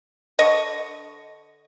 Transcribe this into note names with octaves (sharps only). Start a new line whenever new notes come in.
D3 D#5 C#6